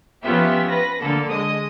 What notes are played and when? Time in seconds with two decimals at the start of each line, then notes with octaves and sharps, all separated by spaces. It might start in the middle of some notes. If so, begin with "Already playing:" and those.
0.23 F3 B3 C#4 F4 G4 E5
0.69 B4 A#6
1.00 D3 A#3 A4
1.31 G#3 D#5 D#6